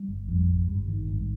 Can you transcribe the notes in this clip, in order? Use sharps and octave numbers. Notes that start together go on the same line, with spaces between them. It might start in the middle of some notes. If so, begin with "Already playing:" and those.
Already playing: G3
G1
F2
G#1
G2
D#3
G#1